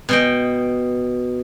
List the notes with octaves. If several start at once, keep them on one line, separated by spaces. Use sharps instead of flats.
B2 D#5 G5